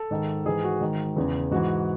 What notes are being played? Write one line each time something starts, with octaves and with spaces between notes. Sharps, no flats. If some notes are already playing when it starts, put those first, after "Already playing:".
Already playing: A4
G#2 D#3
G#2 E3 G#4
F#4
G#2 D#3
E2 C#3 E3
G#2 E3 F#4